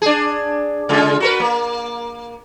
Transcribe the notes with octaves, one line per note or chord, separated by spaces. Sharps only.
D4 G#4
C#3 G#3 F4
F#4 A#4 B4
A#3